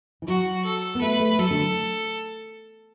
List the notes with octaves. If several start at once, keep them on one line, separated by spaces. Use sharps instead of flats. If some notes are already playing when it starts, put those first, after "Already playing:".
E3
F#3 F#4
A4
B3
A3 B4
A3
F#3 A4
D3